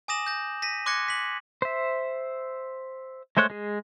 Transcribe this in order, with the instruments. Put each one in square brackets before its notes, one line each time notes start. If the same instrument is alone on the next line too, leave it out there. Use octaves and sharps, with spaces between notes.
[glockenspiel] G#5 D6 D#6 A#6 E7 F#7
G6 A#6
A#6 B6 D#7
C6 D6 F#6 G#6 A#6 C#7
B6 F#7
[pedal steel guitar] C5 E5
G#3 A3 C5 C#5 F#6
G#3 G#4